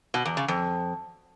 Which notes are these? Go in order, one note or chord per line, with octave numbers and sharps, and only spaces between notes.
B2
E2
C#3
F2